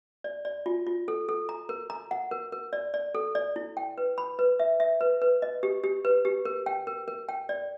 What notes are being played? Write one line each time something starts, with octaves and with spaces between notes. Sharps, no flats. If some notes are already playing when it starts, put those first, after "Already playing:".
D5
D5
F4
F4
A4
A4
A#5
A#4
A#5
F#5
A#4
A#4
D5
D5
A4
D5
E4
G5
B4
B5
B4
E5
E5
B4
B4
D#5
G4
G4
B4
G4
A#4
G5
A#4
A#4
G5
D5